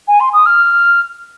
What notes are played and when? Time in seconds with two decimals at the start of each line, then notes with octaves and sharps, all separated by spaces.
0.07 G#5
0.20 C6
0.33 D#6
0.46 F6